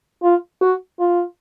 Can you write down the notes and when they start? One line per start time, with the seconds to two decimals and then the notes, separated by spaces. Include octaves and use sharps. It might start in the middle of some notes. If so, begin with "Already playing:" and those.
0.23 F4
0.61 F#4
1.00 F4